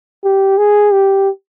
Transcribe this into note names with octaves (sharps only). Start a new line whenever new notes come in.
G4
G#4
G4